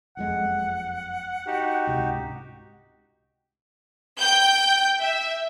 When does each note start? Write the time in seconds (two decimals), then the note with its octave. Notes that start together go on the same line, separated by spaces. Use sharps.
0.17 F#1 F2 G#3 F#5
1.47 D#4 F#4 G4
1.87 C#2 G#2 C3
4.20 G5 G6
5.01 E5